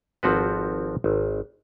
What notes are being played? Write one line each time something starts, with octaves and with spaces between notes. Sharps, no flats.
G#1 F3 C4 F#4 A4 B4
G#1